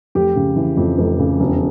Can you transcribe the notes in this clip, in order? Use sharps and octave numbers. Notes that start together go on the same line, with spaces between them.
F1 G4
C#3
E3
F2
F1
C#3
E1